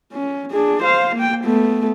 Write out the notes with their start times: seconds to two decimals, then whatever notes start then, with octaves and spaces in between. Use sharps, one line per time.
0.13 C#4
0.52 D4 G#4
0.83 C5 F5
1.16 A#3 G5
1.45 A3 B3